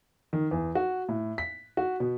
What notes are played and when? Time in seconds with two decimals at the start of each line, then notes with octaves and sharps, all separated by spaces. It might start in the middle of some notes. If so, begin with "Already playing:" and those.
0.33 D#3
0.51 E2
0.75 F#4
1.09 A2
1.38 B6
1.77 F#4
2.00 B2